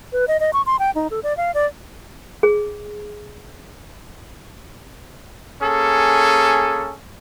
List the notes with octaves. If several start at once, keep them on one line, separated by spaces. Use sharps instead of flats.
B4
D#5
D#5
C#6
C6
G5
D#4
A4
D5
F5
D5
G#4
A#3 C#4 G#4 A4